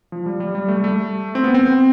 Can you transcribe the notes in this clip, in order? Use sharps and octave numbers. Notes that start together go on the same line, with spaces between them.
F3
G3
G3
G3
A3
G3
A3
C4
B3
C4